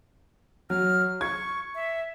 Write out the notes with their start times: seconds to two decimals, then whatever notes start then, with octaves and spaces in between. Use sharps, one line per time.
0.70 F#3 F6
1.21 C#6 G#6
1.75 E5